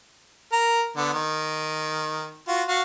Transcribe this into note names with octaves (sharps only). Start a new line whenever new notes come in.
A#4 A#5
D3 B3
D#3
F4 F#4
F#4 F5